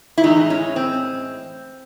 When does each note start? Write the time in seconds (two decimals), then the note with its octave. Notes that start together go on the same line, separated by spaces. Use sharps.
0.18 E4
0.23 A2 E3 G#3 D#4
0.50 C#4
0.76 C4